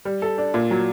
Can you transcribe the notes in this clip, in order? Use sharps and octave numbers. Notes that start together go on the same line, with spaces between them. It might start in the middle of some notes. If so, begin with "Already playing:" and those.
G3
A4
D4
A#2
F#3